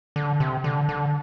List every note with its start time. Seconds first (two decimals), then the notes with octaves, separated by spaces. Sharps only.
0.16 D3
0.40 C3
0.64 D3
0.89 D3